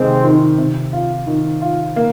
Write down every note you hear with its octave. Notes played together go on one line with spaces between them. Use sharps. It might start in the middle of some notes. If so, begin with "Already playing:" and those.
Already playing: C3 D#3 G#3 C4
D#3
C3
F4
D#3
F4
A#3